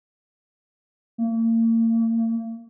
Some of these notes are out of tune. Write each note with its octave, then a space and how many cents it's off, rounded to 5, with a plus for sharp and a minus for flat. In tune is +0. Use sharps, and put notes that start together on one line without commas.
A#3 -40